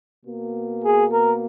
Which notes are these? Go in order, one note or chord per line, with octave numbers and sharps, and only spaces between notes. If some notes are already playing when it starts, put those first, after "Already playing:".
B2 A#3
G#4
A#4